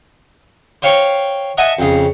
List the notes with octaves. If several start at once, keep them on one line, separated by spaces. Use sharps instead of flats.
C5 C#5 F5 G5 C#6
D#5 E5 F#5 G#5 A5 D#6
F2 C#3